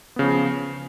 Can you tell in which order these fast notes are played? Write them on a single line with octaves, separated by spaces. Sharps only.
B3 C#3 F3